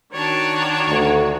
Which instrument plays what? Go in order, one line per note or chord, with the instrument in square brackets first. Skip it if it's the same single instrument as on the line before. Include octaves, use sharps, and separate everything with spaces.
[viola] D#3 F#4 [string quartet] D4 D5 [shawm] C#5
[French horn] D2